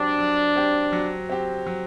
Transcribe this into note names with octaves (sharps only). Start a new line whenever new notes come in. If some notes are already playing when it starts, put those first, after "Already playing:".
Already playing: F#3 C4 D4 G4
F#3
C4 G4
F#3
C4 G4
F#3